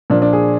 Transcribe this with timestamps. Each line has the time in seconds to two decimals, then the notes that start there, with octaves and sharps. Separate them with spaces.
0.10 A#2 F3 D4
0.22 D4
0.33 G#4